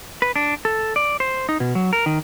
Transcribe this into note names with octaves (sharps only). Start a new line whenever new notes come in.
B4
D4
A4
D5
C5
D#4
B2
F#3
A#4
D#3